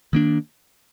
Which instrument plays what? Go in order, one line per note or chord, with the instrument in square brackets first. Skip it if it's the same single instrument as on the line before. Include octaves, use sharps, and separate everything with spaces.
[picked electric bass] D#3 A#3 D4